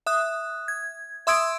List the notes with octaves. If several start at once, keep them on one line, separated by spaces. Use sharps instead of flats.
E5 D#6 F#6
G#6
E5 C6 D#6 E6 G#6 D7